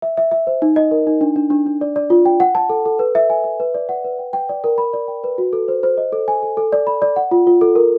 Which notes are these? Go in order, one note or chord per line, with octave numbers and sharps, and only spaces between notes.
E5
E5
E5
C5
D#4
D#5
A#4
D#4
D4
D4
D4
D4
D5
D5
F4
G5
F#5
A5
A4
A4
B4
E5
G#5
E5
B4
D5
F#5
B4
G5
G5
D5
A#4
B5
D5
G5
B4
F#4
A4
C5
C5
D#5
A4
G#5
A4
A4
D5
B5
D5
F#5
F4
F4
A4
A#4